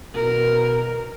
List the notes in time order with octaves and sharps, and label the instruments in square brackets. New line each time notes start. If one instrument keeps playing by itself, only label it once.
[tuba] B2 [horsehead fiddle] A#4